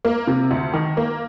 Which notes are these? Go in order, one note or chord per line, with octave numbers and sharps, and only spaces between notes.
A#3
C3
D2
D#3
A#3